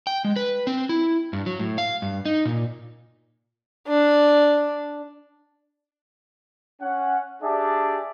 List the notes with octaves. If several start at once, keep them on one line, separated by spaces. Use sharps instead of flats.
G5
G#3
B4
C4
E4
G2
F#3
A2
F5
G2
D#4
A#2
D4
C#4 F#5
D4 G4 G#4 D5 E5 A5